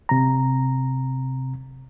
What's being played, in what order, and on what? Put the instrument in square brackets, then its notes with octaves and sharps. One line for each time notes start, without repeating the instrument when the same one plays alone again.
[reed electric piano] C3 A#5